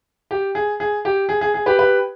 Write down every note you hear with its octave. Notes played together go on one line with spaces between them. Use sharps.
G4
G#4
G#4
G4
G#4
G#4
G#4
G4 B4
G4 B4